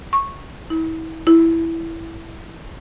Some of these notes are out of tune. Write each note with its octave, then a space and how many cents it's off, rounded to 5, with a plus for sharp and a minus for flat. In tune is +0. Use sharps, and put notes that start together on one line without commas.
C#6 -10
E4 -35
E4 +0